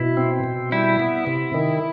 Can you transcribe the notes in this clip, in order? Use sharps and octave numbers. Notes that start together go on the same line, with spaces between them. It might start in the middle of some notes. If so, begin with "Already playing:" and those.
Already playing: B2 E4
C4
B2
G3 E4
B3
C3
D#3